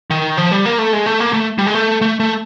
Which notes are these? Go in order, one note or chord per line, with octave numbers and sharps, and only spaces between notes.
D#3
F3
G3
A#3
A3
G#3
A3
A#3
A3
G3
G#3
A3
A3
A3